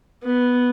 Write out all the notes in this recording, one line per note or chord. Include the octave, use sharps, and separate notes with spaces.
B3